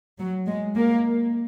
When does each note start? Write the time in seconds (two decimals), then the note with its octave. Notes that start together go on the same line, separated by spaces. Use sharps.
0.19 F#3
0.48 G#3
0.76 A#3